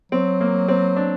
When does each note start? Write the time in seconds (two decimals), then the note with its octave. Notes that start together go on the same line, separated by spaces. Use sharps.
0.12 F#3 C4
0.41 A#3
0.68 C4
0.96 D4